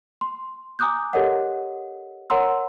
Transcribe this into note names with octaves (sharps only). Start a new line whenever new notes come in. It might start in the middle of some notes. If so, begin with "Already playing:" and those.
C6
G#5 A#5 D6 D#6 F#6 G6
G4 A4 A#4 C#5 D#5 F#5
A#4 C#5 F#5 A#5 C6 E6